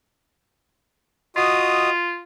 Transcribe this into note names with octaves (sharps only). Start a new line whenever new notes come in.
F4 F#4 D#5 D#6